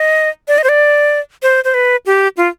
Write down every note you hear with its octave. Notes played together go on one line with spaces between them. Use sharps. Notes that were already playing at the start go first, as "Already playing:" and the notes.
Already playing: D#5
D5
D#5
C5
D5
C5
C5
B4
G4
F4